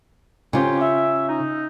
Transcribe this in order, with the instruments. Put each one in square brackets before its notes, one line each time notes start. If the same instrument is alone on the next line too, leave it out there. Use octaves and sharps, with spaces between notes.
[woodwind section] F2 G4 [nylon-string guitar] C#3 F4
[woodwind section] E5
D#4